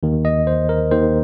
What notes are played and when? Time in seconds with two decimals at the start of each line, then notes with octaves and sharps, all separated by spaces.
0.03 D#2 D#3
0.25 D#5
0.47 C5
0.69 A#4
0.91 D#2 D#3 C5